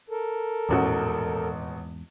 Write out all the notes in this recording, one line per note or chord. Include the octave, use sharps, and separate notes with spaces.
A4 A#4
D#1 A1 E2 G#2 F#4